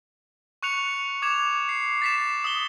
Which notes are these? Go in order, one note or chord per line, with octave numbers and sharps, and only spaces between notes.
C#6 F#6 C#7 F7
D6 G#6 E7 F7
C7
A6 B6 E7
D#6 G7